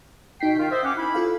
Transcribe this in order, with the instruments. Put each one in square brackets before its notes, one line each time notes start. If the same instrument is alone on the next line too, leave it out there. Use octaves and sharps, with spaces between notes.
[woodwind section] B2 G5 [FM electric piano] D#4 B6 C7
[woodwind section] D#3 F4
C5 D#5 E5
C#4 F#5 D6
E4 B5
[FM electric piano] F4 A4 F5